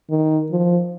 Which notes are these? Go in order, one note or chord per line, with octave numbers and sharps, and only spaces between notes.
D#3
F3